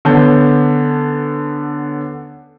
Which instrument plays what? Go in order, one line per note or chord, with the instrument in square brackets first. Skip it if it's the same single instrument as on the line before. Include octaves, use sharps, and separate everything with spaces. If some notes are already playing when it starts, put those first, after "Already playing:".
[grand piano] D3 B3 C#4 A5 G6